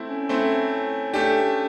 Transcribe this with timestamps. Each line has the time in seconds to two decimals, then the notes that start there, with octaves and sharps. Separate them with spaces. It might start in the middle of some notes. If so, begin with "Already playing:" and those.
Already playing: A3 C4 E4
0.09 C#4
0.29 A3 C4 E4
1.13 A3 D4 G4